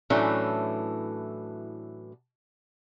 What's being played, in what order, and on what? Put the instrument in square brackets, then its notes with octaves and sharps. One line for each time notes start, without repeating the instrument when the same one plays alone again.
[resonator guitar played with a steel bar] A2 E3 F#3 A3 C#4 D4